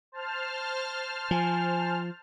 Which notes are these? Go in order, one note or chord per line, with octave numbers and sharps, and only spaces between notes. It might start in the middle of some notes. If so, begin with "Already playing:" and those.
C5 A5 F6
F3 G#5